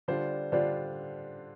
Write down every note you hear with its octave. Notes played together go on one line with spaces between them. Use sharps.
D3 G3 D4 F4 C5
D3 G3 D4 F4 C5